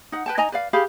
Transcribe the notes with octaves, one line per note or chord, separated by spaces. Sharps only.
D#4 F#5
B4 G5 A5
D#4 D#5 G#5 A#5
B4 D5 F5
G4 G#4 F5 B5